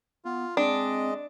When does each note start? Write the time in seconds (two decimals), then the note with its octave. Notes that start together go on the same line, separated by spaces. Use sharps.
0.25 B3 F4
0.57 G#3 C4 D4 D#5